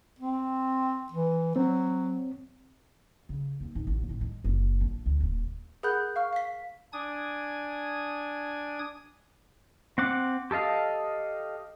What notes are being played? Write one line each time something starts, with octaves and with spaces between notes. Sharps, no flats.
C4
E3
F#3 C4
C#3
D#2
G#2
A1
A2
G#3
F#1
A#1
D2
D#1
G#4 A#4 F#5 B5 F#6 G6
F5 C#6 F6
F5 B6
D4 G#5 D#6 G#6
C4 F#5 D6
G4 A4 D#5 F5